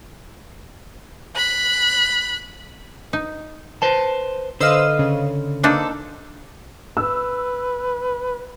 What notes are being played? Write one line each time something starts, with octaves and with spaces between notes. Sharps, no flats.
B5 F#6
D#4
B4 C5 A5
D3 B4 C5 D#5 F5 E6
C#3
A#3 C4 D4 D#4 A4
B4 E6